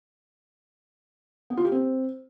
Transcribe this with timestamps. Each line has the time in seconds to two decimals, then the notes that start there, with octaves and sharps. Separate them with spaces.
1.50 B3
1.57 F4
1.65 G4
1.72 C4